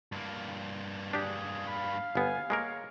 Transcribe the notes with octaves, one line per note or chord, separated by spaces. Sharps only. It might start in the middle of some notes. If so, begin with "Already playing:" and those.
G2 A#3
D4 G4 G#4
F5 B5
G1 B3 G#5
G#3 A#3 A#4 C#5